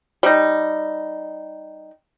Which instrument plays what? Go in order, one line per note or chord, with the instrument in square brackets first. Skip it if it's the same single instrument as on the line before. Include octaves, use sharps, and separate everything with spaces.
[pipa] G3 D#4